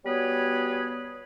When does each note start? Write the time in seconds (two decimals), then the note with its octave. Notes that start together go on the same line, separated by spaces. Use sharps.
0.05 G3 B3 F#4 G#4 B4 C#5